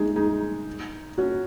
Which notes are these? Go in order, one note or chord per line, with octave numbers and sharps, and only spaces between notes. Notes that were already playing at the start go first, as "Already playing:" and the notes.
Already playing: G#3 D#4 G#4
D#4 G#4
C#4 F#4